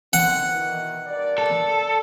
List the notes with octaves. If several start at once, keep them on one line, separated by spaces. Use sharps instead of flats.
D3 D#3 C4 F#5
B2 D#3 E3
G2 A#4 D5
A4